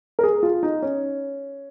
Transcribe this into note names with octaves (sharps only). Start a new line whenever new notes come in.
A#4
G#4
F4
D#4
C#4